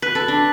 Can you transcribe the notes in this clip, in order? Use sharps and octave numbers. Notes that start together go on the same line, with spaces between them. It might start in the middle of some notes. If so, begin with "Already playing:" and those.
B4 F#6 B6 F#7
A4
D4